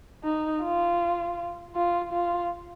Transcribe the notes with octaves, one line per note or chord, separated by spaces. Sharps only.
D#4
F4
F4
F4